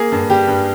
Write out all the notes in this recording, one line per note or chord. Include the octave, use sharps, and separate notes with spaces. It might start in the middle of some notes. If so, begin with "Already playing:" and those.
Already playing: A#3 G#4
G2
G3 G4
G2